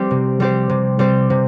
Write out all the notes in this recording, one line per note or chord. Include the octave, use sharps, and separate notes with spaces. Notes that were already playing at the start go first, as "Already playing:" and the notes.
Already playing: G3 C4 G4 C5
C3
G3 C4 G4 C5
C3
G3 C4 G4 C5
C3